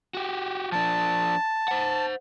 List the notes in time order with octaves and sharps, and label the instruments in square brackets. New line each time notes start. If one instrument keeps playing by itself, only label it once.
[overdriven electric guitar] F#4 G4
[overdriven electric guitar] F3 D4 [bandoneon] A5
[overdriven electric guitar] C5 F#5